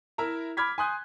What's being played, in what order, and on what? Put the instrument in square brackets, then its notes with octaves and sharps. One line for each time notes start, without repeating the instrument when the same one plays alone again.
[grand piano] E4 A#4 E5 A#5
B5 D6 F6 G#6 B6
G#5 C6 D#6 F#6 G6